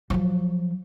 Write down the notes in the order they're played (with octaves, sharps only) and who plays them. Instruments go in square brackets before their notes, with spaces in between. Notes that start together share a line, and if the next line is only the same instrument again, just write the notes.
[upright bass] F3 F#3